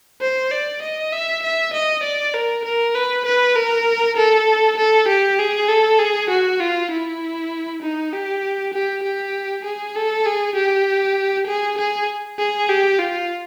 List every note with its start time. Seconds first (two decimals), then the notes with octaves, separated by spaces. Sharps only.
0.22 C5
0.51 D5
0.82 D#5
1.12 E5
1.43 E5
1.74 D#5
2.03 D5
2.34 A#4
2.65 A#4
2.95 B4
3.25 B4
3.56 A#4
4.17 A4
4.78 A4
5.08 G4
5.39 G#4
5.68 A4
5.99 G#4
6.30 F#4
6.60 F4
6.91 E4
7.82 D#4
8.13 G4
8.74 G4
9.03 G4
9.65 G#4
9.96 A4
10.26 G#4
10.55 G4
11.47 G#4
11.78 G#4
12.39 G#4
12.69 G4
12.99 F4